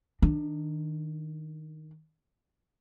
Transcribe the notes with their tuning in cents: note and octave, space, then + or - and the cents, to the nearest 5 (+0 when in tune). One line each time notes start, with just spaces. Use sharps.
D#3 +0 D4 +20